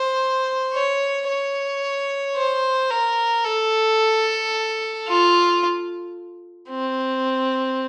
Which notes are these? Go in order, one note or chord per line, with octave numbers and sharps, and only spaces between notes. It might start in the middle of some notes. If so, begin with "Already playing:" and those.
Already playing: C5
C#5
C#5
C5
A#4
A4
F4
C4